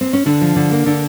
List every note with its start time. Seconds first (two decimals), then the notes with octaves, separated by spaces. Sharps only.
0.01 C4
0.13 C#4
0.26 D3 D4
0.41 F3
0.56 D3
0.72 A#3
0.86 D3